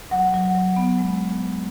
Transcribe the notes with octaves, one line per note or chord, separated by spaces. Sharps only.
F#3 F#5
F#3
F#3
B3
G#3